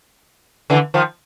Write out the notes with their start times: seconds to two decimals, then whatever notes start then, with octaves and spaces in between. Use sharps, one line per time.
0.70 D3 E3
0.94 D#3 F3